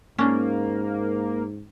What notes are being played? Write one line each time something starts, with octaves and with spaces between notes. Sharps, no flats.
G#2 A#3 C#4 D4